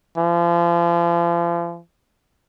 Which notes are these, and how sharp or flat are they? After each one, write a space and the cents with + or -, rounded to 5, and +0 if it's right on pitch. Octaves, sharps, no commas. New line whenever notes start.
F3 -35